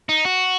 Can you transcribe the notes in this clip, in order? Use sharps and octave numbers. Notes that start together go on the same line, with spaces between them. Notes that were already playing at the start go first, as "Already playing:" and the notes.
D#4
F#4